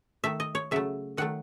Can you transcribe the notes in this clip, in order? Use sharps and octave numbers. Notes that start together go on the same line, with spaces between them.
D#3 A3 E5
D#5
C#5
C#3 F#3 A3 E5
D#3 F#3 A3 F#5